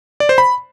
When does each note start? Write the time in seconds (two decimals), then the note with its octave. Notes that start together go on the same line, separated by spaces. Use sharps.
0.20 D5
0.29 C5
0.38 B5